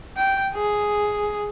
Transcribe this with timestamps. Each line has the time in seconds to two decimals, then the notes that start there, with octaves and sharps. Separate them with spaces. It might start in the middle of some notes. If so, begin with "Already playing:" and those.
0.17 G5
0.55 G#4